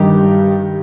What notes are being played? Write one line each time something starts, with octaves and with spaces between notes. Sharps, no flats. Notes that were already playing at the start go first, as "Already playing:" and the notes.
Already playing: G2 D#3 G3 D#4 G4